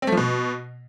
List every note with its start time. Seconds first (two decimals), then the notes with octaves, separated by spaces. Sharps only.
0.02 C4
0.07 A3
0.12 F3
0.17 B2